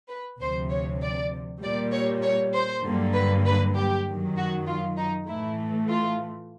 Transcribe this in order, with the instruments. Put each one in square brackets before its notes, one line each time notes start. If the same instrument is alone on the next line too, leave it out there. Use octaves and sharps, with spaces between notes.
[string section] B4
D2 C3 F3 C5
C#5
D5
A#2 G3 A#3 D5
C#5
C#5
C5
G2 D3 F#3 A#3
B4
B4
G4
F#2 D#3 F#3
F#4
F4
D#4
A2 E3 A3 E4
F4